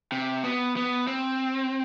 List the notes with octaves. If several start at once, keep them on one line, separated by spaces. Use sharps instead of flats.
C3
B3
B3
C4